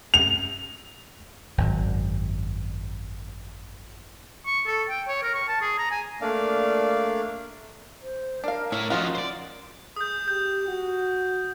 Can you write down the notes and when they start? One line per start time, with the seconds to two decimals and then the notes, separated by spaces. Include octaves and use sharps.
0.14 F7
1.58 G#1 F#2
4.46 C#6
4.66 A4
4.89 G5
5.08 C#5
5.23 A#4
5.34 C#6
5.48 A5
5.61 G#4
5.78 A#5
5.91 G#5
6.21 A3 A#3 D4 D5 F5
8.01 C5
8.44 D4 A#4 F5
8.72 A2 E4 C#5
8.90 F3 C#4 D#4 F4 F#4
9.15 C5 D5 C6
9.96 G#4 D#6 G6
10.28 G4 G6
10.68 F#4